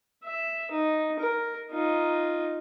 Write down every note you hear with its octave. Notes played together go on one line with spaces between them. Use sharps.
E5
D#4
A#4
D#4 F4